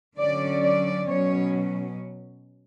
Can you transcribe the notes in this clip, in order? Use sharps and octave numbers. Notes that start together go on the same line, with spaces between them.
D3 F#3 C#4 D5
D5
B2 F#3 C#4 C#5